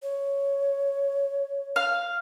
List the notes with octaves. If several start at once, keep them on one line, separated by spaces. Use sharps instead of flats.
C#5
F5 F6